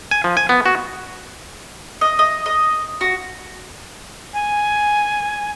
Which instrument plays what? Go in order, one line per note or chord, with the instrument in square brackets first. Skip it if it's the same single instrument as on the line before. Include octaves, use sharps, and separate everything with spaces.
[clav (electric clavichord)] G#5
F3
G#5
B3
F#4
[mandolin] D#5
D#5
D#5
F#4
[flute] G#5